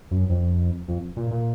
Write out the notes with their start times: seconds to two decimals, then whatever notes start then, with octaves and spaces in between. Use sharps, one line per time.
0.11 F#2
0.29 F2
0.88 F2
1.16 A#2
1.31 A#2